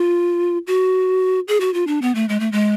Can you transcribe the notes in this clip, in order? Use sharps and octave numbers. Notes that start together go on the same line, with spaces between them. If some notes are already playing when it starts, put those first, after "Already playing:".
Already playing: F4
F#4
G#4
F#4
F4
D4
B3
A3
G#3
A3
G#3